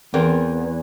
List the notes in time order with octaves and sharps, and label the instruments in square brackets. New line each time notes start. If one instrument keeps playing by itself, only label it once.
[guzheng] E2 [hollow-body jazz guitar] C4 A#4 G5